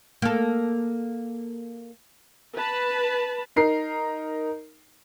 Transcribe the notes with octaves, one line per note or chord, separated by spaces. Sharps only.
A#3 A4
B4 A5 B5
D#4 A#4 C7